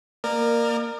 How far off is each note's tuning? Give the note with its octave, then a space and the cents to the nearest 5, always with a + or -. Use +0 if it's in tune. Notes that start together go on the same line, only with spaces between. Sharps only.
A#3 +0 A#4 -5 D5 +35